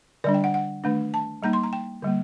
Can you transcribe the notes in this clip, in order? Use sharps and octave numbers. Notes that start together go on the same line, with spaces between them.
D3 G3 D4 D5
G5
F#5
F#5
D#3 A3 D4
A5
G3 A#3 D#4 A#5
C6
A#5
G5
D3 G3 A#3